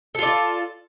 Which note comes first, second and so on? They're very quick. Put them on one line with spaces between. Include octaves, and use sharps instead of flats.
A4 F4 D5